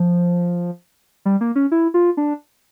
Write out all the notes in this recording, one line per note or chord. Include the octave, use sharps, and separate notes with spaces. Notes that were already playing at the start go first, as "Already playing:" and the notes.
Already playing: F3
G3
A#3
C#4
E4
F4
D4